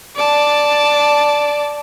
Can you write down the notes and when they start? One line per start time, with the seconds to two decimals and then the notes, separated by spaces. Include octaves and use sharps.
0.16 D5 A5